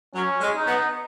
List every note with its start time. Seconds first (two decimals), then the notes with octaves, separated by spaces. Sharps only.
0.15 F#3 C#4
0.41 G#3
0.54 D#4
0.67 B3